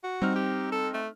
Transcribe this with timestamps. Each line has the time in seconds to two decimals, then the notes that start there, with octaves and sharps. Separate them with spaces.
0.04 F#4
0.22 G3 C4 D#4 F6
0.36 G4
0.72 A4
0.94 A3